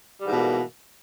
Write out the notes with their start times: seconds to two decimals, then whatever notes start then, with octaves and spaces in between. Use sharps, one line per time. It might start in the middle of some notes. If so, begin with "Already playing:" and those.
0.21 G3
0.24 G#2
0.26 E3
0.29 B2
0.32 A#3